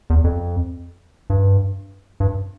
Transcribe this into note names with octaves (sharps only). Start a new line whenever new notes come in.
E2
F2
G2
G2